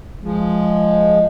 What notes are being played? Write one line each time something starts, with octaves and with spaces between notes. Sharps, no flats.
F3 G#3